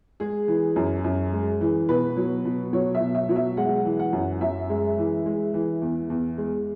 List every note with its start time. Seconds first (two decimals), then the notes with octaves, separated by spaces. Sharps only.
0.20 G#3 G#4
0.48 E3
0.76 F#2
1.04 F#2
1.32 G#3
1.61 E3
1.89 B2 B4
2.16 F#3
2.45 B2
2.73 F#3 C#5
2.95 E5
3.00 B2
3.15 E5
3.29 F#3
3.36 E5
3.57 G#3 F#5
3.85 E3
3.99 F#5
4.13 F#2
4.41 F#2 E5
4.70 G#3
4.98 E3
5.26 G#3
5.54 E3
5.82 E2
6.10 E2
6.38 G#3